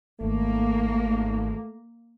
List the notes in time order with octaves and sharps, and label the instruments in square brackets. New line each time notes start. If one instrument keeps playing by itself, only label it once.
[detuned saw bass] G#1 [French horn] A3 [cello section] A#3